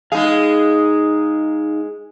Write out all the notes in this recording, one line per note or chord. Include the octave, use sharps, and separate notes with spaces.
G#3 D#4 G#4 F5